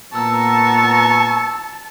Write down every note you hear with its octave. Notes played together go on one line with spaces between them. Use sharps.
A#2 B3 A5 A#5 C#6 E6